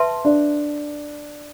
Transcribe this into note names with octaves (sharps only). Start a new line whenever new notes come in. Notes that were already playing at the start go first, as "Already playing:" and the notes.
Already playing: B4 E5 A5 C6
D4